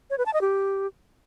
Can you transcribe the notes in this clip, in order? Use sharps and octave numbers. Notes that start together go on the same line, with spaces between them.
C#5
B4
A5
D#5
G4